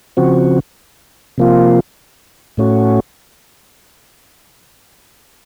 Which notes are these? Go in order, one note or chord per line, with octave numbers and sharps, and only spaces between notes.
C#3 F3 C4 F#4
C3 F3 A#3 F4
A2 A3 C#4 F#4